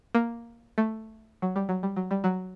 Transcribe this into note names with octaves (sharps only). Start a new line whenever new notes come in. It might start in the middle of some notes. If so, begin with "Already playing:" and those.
A#3
A3
F#3
G3
F#3
G3
F#3
G3
F#3